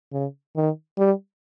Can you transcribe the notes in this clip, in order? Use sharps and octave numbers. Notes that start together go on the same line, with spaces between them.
C#3
D#3
G3